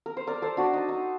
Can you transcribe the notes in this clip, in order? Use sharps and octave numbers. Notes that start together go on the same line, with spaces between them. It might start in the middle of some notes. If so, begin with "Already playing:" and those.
A#4
C5
A#4 D5
A4 C5
D4 F#4
D#4
D#4